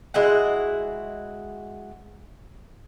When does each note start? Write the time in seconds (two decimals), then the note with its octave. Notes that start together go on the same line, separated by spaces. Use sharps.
0.14 G#3 E4 F#4 F#5